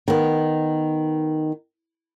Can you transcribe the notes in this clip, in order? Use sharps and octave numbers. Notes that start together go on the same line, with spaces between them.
D#3 B3